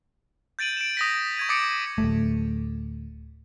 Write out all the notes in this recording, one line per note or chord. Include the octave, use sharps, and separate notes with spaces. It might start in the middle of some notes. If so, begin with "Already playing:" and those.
G6 A6 D7 D#7 F#7
D7 E7
D#6 A#6 B6
C#6 G#6 D#7
D6 D#6 A6 C#7 D7
D1 G1 A3